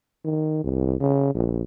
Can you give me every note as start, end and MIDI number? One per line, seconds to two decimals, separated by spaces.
0.25 0.60 51
0.64 1.00 36
1.00 1.30 49
1.35 1.62 34